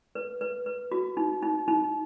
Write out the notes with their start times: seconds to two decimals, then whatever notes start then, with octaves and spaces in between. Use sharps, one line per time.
0.15 B4
0.41 B4
0.66 B4
0.92 F#4
1.17 D#4
1.42 D#4
1.68 D#4